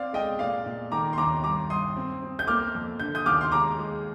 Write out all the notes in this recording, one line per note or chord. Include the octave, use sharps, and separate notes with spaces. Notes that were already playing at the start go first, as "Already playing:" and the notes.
Already playing: C4 D5 F5
G#3 D#5 G5
A#2 D5 F5
A#2
D#3 A#5 D6
C6
D#2 A#5 D6
G2 A#5 D6
G2 C6 D#6
C4
C4
G6
A#3 D6 F6
F2
D3 G6
D#6 G6
D#2 D6 F6
C6
G#3 A#5 D6
G#3